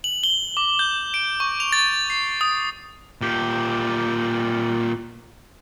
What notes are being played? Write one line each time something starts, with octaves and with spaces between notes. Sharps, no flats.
F#7
G7
D6
G6
D7
C#6
F7
A6
C7
D#6
A#2 G4